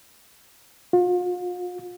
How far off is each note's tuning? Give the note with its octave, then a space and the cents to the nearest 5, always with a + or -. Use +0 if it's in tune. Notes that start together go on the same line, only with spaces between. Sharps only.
F4 +40